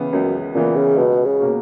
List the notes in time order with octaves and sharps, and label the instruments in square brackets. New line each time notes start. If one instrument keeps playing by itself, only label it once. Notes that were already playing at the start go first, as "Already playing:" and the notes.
Already playing: [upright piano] C#2 C#3 E3 B3
[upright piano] C#2 [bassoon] F#2
[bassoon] A#2 [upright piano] C#3 E3 B3
[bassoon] C#3
[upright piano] C#2 [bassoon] B2
[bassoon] C#3
[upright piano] B2 A#3 C#4 F#4